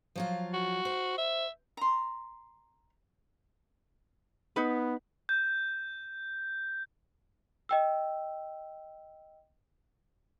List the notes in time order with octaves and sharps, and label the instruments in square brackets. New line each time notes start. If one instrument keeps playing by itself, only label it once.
[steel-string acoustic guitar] F3 F#3 F4
[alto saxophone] F#4
[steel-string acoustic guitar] C5
[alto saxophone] E5
[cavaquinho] A#5 C6
[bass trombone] B3 [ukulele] D#4 B4
[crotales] G6
[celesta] D#5 G5 E6